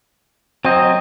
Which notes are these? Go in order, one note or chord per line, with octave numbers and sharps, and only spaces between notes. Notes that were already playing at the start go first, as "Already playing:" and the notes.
F#3 C4 D#5